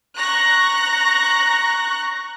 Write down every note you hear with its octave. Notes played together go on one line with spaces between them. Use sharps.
A#5 C#6 F#6 A#6